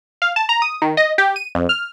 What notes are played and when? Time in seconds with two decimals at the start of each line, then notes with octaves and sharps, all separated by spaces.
0.22 F5
0.36 A5
0.49 A#5
0.62 D#6
0.82 D#3
0.97 D#5
1.18 G4
1.36 D#7
1.55 F2
1.69 F6